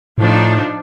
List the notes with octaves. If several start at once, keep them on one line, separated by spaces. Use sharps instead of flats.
A2 F3 D4 D#4